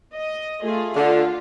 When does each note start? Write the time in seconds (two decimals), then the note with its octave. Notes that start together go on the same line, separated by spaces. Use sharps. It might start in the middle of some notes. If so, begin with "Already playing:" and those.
0.14 D#5
0.62 A3 F4 G#4
0.96 D3 F4